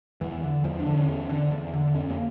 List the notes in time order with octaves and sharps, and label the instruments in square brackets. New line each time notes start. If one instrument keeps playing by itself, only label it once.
[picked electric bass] E2 E3
D3
E2 F3
D4
D3
C#4
E2
D3
E2
D3
F2 C#4
A#3